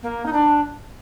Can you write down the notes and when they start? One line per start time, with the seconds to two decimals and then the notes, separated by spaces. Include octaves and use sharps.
0.02 A#3
0.25 D#4
0.32 D4